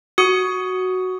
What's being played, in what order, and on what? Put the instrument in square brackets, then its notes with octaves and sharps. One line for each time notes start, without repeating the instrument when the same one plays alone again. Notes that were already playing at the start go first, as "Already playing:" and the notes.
[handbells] F#4 D#6 C#7